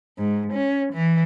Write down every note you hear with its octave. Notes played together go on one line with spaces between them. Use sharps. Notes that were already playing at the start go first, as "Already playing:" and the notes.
G#2
C#4
E3